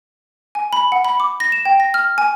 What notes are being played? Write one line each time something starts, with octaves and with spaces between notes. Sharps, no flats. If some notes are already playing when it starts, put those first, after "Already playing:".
G#5
B5
F#5
B5
D6
A#6
E7
G5
A#6
F6
G#5